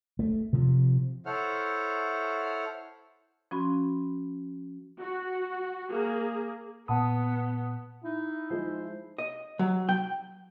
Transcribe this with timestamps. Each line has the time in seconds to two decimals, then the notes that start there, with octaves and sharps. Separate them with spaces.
0.19 A3
0.53 C3 F3
1.26 E4 A4 C5 C#5 F#5 F6
3.51 F3 C#4 F#4 B5 C6
4.99 F#4
5.89 A#3 G#4
6.88 A#2 B3 F#5 A5 B5 D#6
8.04 D#4 E4
8.50 F3 G#3 D#4 C5
9.18 D#5
9.59 F#3
9.89 G5